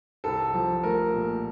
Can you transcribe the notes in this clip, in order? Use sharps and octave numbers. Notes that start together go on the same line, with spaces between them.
C2 A4
F3
A3 A#4
A#2